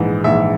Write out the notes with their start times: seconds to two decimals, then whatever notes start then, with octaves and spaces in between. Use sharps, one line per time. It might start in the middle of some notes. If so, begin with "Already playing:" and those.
Already playing: A#1 G#2 E3
0.24 A#1 G#2 E3 E5